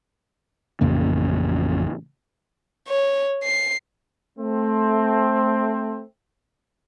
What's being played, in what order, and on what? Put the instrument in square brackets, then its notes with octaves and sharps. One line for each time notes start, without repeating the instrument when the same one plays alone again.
[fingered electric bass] A1 F2 C#3 A#3
[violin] C#5
C7
[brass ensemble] A3 C4